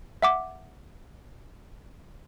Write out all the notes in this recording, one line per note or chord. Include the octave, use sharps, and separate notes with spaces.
E5 F#5 D6